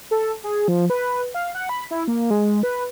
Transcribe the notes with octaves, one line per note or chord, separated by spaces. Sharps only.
A4
G#4
F3
B4
F5
F#5
B5
E4
A#3
G#3
B4